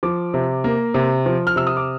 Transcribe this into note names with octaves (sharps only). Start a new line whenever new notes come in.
F3 D6
C3
A#3
C3
F3
F6
C3 E6
D#6
D6